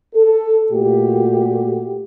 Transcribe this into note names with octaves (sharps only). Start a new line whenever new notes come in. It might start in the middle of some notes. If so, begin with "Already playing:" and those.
A4
A#2 A3 F#4 G4